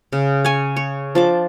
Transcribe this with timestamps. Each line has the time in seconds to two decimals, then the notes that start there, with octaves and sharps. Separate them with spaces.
0.13 C#3
0.45 C#5 G#5
0.76 C#5
1.15 F3 D4 D6